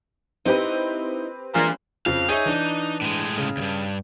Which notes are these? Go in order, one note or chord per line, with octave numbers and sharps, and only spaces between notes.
C4 D#4 E4 G4 B4 D#5
A#2 E3 G#3 D4
F2 C#3 F3 F5
D#4 G#4 C#5 E5
E3 D4
A2 G#3
C#3
D2 G2